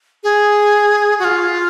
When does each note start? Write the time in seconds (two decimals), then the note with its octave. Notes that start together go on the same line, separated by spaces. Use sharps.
0.23 G#4
1.19 F#4
1.24 F4